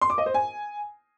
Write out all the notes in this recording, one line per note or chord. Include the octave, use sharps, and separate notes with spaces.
C6
D6
D#5
C5
G#5